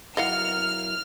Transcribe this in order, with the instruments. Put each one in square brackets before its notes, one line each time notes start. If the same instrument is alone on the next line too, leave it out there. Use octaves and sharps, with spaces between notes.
[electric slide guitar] F#3 E4 A#4 [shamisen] D#5 F5 F#5 [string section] F6